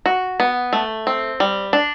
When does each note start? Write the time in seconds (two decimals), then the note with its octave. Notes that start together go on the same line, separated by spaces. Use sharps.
0.06 F#4
0.40 B3
0.73 A3
1.07 C4
1.40 G3
1.73 D4